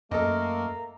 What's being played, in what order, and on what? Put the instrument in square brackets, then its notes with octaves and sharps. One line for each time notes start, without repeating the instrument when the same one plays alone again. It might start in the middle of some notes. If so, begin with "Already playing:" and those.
[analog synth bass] F#2 [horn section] A3 A#3 [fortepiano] A4 D#5 [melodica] A#5